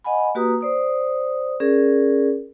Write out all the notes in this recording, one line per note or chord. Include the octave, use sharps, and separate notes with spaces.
D#5 F#5 G#5 B5
A#3 F#4 G4 B4 A#5 D#6
C5 D5 D#6
C#4 G#4 A#4 D5